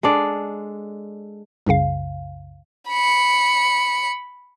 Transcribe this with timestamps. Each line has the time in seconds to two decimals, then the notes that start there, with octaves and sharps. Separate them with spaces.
0.03 G#3 D4 A4 D5
1.66 C2 F#2 C#3 F5
2.89 B5 C#7